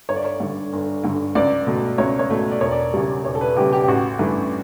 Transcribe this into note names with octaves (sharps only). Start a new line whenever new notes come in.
G1 C#5
D5
C#5
G2 D3
G1
G2 D3
C#2 D5
B2 A3
C#2 C#5
C#5
B2 A3
D5
E1 C#5
D5
E2 C#3 G3
E1 C#5
A4
B4
E2 C#3 G3 G4
G4
G4
A1 F#4
G2 E3 A3